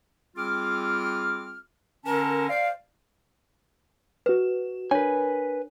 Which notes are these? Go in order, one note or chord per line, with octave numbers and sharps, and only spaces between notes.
G3 C4 F4 G#4 D6 F6
D3 C#4 A#4 A5
C5 D5 F5
F#4 B4 E7
D4 A#4 B4 C#5 G#5